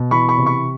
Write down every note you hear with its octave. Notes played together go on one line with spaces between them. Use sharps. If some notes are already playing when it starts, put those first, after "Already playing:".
Already playing: B2
E3 B5 C#6
B5 C#6
C3
B5 C#6